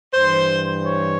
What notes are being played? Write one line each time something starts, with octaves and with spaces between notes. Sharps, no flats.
G2 E3 C5
C#5